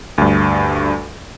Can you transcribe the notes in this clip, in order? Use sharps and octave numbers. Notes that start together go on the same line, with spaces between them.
D2 G2